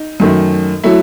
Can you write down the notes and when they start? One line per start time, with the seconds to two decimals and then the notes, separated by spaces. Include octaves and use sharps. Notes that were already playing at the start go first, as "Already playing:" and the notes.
Already playing: D#4
0.20 F#2 D#3 A3
0.84 F#3 A3 E4